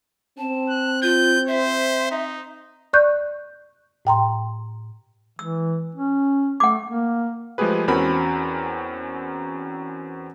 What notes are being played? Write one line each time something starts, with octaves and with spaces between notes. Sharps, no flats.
C4 A5
F#6
F4 G6
C5 E5
D#4
D5 C#6 F#6 G6
A2 G5 A#5 C6
E3 E6
C#4
A3 F#5 D6
A#3
F3 G#3 A3 G4 G#4 B4
E2 C4 C#4 F#4 A#4 B5